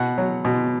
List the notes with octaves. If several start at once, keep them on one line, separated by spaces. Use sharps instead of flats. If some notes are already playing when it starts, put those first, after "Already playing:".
Already playing: B2 F#5
F#3
B2